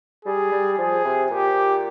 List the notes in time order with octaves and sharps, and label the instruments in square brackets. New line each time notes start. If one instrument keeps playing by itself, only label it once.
[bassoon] G3 [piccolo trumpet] G#4
[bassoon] G3
[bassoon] F3 [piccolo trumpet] G#4
[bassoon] C3
[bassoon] A#2 [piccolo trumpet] G4